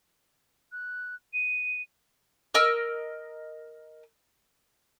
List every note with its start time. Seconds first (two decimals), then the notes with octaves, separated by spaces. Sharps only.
0.71 F#6
1.33 D#7
2.54 A#4 D#5 E6 F6